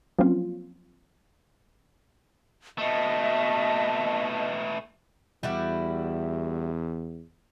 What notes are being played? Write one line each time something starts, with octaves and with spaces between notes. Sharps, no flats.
F3 F#3 A#3 C4 C#4 F4
B2 A3 D#5 E5 A5
E2 G3 E4 F#4